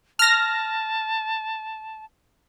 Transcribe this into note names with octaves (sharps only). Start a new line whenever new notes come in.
A5 F6 A#6